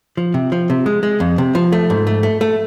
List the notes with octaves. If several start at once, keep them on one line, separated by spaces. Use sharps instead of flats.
F3
C3
F3
C3
G#3
G#3
F2
C3
F3
A3
G#2
A3
A3
A3